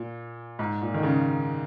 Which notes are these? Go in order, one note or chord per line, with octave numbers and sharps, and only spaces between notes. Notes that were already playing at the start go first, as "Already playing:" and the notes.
Already playing: A#2
G#2
A#2
D#3
C#3